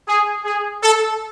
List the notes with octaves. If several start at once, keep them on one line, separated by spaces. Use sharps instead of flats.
G#4
G#4
A4